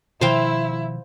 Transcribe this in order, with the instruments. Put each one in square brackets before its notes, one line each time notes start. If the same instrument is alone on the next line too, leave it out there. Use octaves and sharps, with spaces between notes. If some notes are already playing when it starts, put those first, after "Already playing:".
[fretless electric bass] B2 D#3 F3 [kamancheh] E4 E5 [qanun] C5 F5 G5